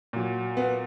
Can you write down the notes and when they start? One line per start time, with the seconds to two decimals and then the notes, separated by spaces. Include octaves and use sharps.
0.13 A#2 F#3
0.57 B3